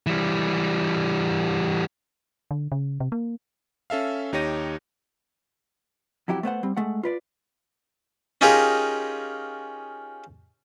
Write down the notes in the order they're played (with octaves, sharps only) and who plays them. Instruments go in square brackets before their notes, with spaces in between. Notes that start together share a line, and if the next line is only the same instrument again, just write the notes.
[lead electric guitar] E3 G3
[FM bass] D3
C#3
C3
A#3
[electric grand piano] C#4 A4 E5 F5
D#2 D#4 G4 C#5 A#6 D#7
[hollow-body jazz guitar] F2 F#3 E4 G4
A3 B3 C5 F#5
G3 C4
G#3 A3 F#5
F4 B4 D5
[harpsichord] C#4 D#4 F4 G4 G#4 A#4